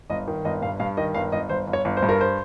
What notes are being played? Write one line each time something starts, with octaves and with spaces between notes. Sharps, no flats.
G1 D#5
D#3
G1 D#5
G2 F5
G2 F5
D#3 D#5
G1 F5
G1 D#5
G1 C5
G1
C#5
G1
C5
G2
A#4
C5